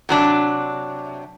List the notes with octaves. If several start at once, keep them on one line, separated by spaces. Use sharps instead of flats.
C3 F#3 D4